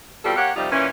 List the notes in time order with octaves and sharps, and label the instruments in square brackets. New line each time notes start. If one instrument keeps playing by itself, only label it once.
[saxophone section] B2 G3 C4 F4 A4
A#3 G4 C#5 F#5
F2 C3 G3 D#4 F4
A#2 E3 C#4